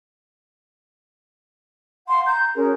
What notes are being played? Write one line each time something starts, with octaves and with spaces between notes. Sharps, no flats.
F5 F#5 C6
A#5 G6
C#4 F#4 G#4 A#4